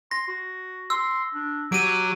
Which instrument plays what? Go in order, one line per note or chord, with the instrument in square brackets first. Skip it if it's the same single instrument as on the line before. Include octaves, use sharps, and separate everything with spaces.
[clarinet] C6 [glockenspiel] A#6
[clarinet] F#4
[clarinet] C6 [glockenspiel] E6
[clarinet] D4
[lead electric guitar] F#3 [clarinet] G4 [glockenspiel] D7 D#7